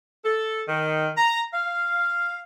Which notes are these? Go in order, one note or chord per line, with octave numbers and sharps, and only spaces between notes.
A4
D#3
A#5
F5